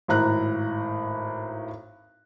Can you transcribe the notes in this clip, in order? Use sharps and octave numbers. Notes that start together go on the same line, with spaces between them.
G#1 A2 A#5 F#6